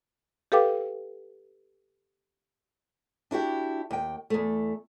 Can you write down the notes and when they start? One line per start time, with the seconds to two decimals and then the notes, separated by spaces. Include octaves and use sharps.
0.52 G4 A4 B4 F5 G5 D6
3.31 D4 E4 F#4 G4
3.91 D#2 G5
4.30 E2 A3